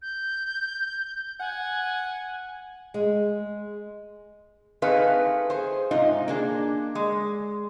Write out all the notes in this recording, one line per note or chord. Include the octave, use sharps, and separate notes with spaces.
G6
F#5 G#5
G#3
A3 C4 D#4 G#4 B4 F5
G#4 C5
G#2 C3 D#4 F4
A#3 D4 G#4
G#3